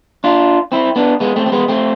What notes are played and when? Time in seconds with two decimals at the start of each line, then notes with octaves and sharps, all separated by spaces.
0.24 D4 F4
0.72 C4 E4
0.96 B3 D4
1.20 G#3 B3
1.36 A3 C4
1.46 C4
1.52 G#3 B3
1.68 A3 C4